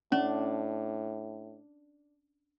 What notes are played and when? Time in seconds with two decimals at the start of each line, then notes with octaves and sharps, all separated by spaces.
0.12 A2 C#4 D4